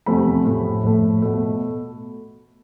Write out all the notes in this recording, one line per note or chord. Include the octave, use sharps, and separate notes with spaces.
E2 C3 F3 A3 B5
A2 F3 A3
A2 F3 A3
B2 A3